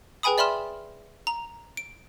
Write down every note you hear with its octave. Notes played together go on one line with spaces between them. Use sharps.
G#4 B4 G5 G#5 B5 D#6
D5 E5 B5 C6 F6 E7
A#5
D7